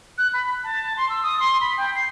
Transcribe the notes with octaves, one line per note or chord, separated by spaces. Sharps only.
F#6
B5
A5
C6
E6
D#6
C6
B5
G5
C7